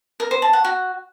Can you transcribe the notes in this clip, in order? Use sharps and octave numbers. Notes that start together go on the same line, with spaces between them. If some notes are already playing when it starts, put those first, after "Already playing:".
A#4
C5
A5
F#5
F#4